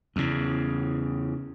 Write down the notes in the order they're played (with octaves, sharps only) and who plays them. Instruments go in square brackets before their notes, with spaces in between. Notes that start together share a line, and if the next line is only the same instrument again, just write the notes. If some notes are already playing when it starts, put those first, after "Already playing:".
[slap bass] E2 C#3